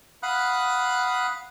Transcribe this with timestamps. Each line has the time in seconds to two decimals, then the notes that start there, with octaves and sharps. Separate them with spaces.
0.23 F5 F#5 B5 D#6 F#6